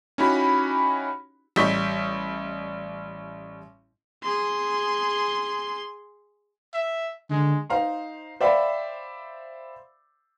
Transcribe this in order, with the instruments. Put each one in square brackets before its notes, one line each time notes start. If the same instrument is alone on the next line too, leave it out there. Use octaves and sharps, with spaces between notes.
[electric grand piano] C#4 D#4 E4 F#4 G4 B5
[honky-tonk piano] A1 G3 D#5 C#6 G6 B6
[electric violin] G#4 C6
[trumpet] E5
[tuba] D3 [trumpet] G#3
[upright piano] D#4 C5 F5 A#5 C6
C5 D5 E5 F5 G5 B5